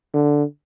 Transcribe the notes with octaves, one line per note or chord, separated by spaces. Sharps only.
D3